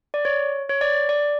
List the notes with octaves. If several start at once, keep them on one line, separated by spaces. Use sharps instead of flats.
D5
C#5
C#5
D5
D5